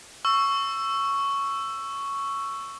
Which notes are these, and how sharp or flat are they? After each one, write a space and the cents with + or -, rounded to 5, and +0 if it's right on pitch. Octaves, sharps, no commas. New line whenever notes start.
C#6 +0 E6 +15